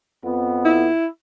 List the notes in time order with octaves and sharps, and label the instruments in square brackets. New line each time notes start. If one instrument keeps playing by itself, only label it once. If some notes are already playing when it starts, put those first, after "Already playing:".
[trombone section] F2 B3
[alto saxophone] E4